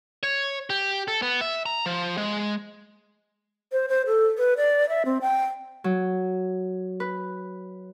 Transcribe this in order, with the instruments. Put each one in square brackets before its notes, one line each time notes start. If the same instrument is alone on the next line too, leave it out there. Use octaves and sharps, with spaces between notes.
[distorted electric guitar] C#5
G4
A4
B3
E5
A#5
F3
G#3
[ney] C5
C5
A4
B4
D5
E5
C4
G5
[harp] F#3
B4